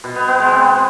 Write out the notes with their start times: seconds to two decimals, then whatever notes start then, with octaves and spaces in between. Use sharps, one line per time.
0.04 B2
0.16 B3
0.28 B3
0.40 G#3
0.52 C4